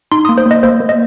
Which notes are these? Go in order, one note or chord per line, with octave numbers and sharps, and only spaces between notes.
D#4 C6
A#3 D#6
C5
A#3
D#5
A#3 C5
A#3
D#5